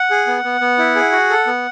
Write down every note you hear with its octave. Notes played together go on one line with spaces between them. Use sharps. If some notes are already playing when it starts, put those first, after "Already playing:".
Already playing: F#5
G#4
B3
B3
B3
E4
G#4
F#4
A4
B3